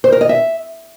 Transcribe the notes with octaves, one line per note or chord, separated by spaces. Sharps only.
C5
A#4
D#5
E5